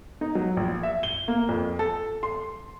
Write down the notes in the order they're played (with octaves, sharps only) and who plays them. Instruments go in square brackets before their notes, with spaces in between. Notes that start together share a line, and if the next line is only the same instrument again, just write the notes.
[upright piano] D#4
F#3
A#1
E5
G7
A#3
F2
A4
C6